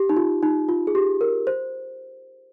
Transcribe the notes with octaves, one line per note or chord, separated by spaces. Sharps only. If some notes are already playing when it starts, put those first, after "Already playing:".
Already playing: G4
D#4
F4
D#4
F4
G#4
G4
A#4
C5